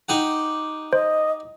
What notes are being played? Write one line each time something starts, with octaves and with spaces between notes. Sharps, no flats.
D#4 G4 F#5
C5 D#5